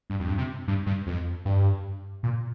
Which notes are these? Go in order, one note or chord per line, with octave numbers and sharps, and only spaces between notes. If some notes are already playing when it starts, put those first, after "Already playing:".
G2
F2
G2
C3
G2
G2
F2
G2
A#2